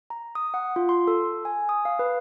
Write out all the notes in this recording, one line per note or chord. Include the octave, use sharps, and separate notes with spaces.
A#5
D#6
F#5
F4
C6
A4
G#5
D#6
F5
B4